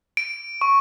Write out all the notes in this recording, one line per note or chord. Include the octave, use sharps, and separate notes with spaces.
D7
C#6